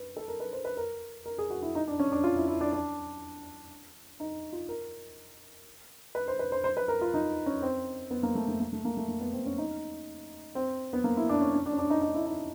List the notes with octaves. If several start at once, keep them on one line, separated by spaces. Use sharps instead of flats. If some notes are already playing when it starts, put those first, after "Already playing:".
Already playing: B4
A4
A#4
B4
C5
B4
A#4
A#4
G#4
F#4
E4
D#4
D4
C#4
D4
F4
E4
E4
D4
D4
D#4
F4
A#4
B4
C5
B4
C5
C5
B4
A#4
F4
D#4
C#4
C4
B3
A#3
A3
A3
A#3
A3
A#3
A3
A#3
B3
C4
C#4
D#4
C4
B3
A#3
E4
D4
C#4
C#4
D4
C#4
D4
D#4
D#4
E4
D#4